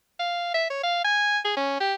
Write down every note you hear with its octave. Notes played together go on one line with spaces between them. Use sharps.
F5
E5
C#5
F5
G#5
G#4
C#4
G4